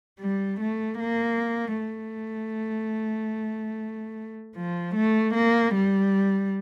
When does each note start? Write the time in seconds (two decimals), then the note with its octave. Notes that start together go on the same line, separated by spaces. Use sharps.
0.20 G3
0.60 A3
0.99 A#3
1.79 A3
4.56 F3
4.96 A3
5.34 A#3
5.74 G3